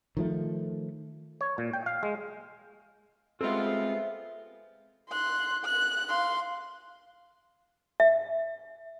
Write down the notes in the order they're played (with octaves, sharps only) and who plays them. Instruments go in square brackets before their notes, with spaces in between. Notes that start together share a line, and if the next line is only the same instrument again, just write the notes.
[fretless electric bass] D#3 F3 A3
[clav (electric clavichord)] C#5
A#2
G5
F5
G#3
[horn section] G3 G#3 F4 [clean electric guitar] B3 C4 [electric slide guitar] A4 C5 E5
[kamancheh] C6 F#6
F#6
F5 C6
[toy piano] E5